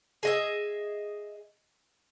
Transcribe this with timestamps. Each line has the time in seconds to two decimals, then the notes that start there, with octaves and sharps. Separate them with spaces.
0.23 G#4 D#5 E5